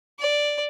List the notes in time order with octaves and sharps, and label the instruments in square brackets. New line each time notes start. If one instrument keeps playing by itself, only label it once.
[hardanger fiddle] D5